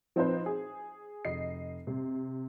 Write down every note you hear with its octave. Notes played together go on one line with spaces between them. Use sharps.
F3 C4 D#4 B4 C5
G#4
F1 D#5 C7
C3